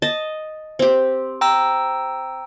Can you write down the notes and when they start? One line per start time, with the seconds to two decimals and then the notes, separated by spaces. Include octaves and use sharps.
0.02 D#5 A5
0.79 C4 G4
1.41 G5 A#5 E6